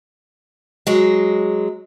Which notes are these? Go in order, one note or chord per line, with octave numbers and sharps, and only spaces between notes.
F#3 G#3